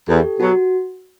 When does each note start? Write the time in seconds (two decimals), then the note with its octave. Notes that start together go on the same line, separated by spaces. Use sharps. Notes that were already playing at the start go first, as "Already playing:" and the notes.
0.08 E2 G4 A4
0.40 B2 F#3 F#4